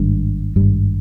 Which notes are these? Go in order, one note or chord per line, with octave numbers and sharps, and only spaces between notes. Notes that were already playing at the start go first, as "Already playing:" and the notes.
Already playing: G#1 G2
G#1 G2 G3